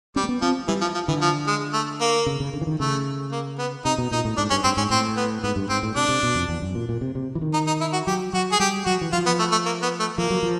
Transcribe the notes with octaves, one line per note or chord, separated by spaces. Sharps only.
G3 C#4
A#3
B3
F3 C4
E3 G3
F3
F3
D3 E3
F3
G#3
A3
A#3
C#3
C#3
D3
E3
D#3
C#3 A3
A#3
B3
C3 D#4
B2
A#2 D#4
A2
G#2 D4
G2 C#4
G2 C4
G#2 C#4
A2 C4
B3
G#2 B3
G2
G#2 C4
A2
C3 D4
C3
B2
F2
E2
F#2
A#2
A#2
C3
C3
E3
D#3
D#4
D#4
E4
F#4
F#3 G4
F#3 F#4
G#4
G3 G4
F#3 F#4
E3
F3 F4
B3
A3
A3
A#3
B3
A3
F3 A#3
F#3
F3